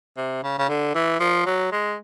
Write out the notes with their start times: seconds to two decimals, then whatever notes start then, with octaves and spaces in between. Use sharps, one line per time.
0.17 C3
0.43 C#3
0.58 C#3
0.69 D3
0.95 E3
1.20 F3
1.46 F#3
1.72 G#3